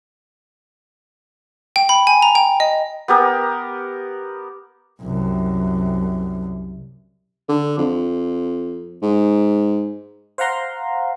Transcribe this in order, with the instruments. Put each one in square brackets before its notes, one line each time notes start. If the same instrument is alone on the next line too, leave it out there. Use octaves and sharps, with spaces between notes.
[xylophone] G5
B5
G#5
A#5
G5
D#5
[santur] B3 G4 A#4
[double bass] C2 F#2
[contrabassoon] D3
F2
G#2
[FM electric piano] C5 F5 F#5 A#5 C6